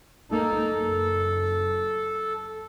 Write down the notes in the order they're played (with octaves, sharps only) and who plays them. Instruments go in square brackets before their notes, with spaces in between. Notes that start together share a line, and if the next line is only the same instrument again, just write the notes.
[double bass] A#3 D#4 [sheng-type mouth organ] A4
[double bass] F#1